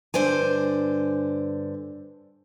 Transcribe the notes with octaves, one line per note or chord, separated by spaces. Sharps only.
G2 D3 C5 D5 G#5